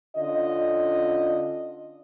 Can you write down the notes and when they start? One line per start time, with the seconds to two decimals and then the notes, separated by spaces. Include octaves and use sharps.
0.17 D3 C#4 F4 D#5